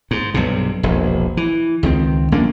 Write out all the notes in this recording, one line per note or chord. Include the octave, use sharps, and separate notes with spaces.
G#2
B1 G2 C3
E1 A#1
E3
C#2 D#3 C4
A#1 A#3 C#4 D4